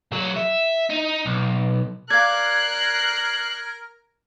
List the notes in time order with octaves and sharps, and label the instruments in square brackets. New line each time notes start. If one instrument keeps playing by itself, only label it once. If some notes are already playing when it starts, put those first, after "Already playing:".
[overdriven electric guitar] A#2 F#3
E5
D#4
B1
[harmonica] A#4 [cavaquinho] D5 F5 [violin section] F#6 C7 [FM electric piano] G#6